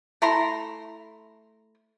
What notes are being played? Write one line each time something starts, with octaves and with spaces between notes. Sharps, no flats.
A3 E4 A#5 C6